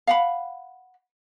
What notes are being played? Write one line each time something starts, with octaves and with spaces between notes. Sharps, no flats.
F5 F#5 B5